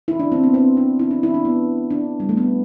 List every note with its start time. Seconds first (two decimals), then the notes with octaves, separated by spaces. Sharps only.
0.08 E4
0.19 D4
0.32 C4
0.43 B3
0.54 C4
0.77 D4
0.99 E4
1.11 D4
1.23 E4
1.34 D4
1.45 B3
1.91 D4
2.20 G3
2.29 A3
2.37 B3